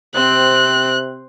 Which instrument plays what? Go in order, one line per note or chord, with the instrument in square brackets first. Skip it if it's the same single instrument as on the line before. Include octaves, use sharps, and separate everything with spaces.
[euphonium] C3 [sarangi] C4 [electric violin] F#6